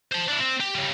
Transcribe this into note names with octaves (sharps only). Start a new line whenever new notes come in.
C5 A5
D4 E4
C4
G4
C#3 G3